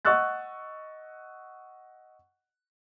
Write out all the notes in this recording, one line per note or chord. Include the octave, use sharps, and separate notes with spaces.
D#5 F#5 C#6 E6 F#6 A6